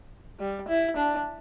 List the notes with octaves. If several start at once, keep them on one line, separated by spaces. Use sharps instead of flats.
G3
E4
D4